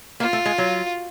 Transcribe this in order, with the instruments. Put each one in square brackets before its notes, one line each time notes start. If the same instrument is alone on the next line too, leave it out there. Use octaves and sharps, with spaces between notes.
[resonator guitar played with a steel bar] A#3 [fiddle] F4
[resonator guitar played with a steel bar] A3
G#3
F#3